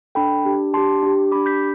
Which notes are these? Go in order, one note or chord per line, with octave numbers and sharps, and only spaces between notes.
D4 A4 G5 B5
D4 G4
D4 G4 A5 C6
D4 G4
D4 G4 B5 D6
G6 B6